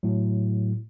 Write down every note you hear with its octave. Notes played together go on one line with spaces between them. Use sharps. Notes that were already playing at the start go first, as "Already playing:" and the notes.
A2 F#3